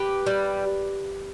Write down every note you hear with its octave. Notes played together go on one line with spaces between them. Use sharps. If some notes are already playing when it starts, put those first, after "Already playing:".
Already playing: G4 B4
G3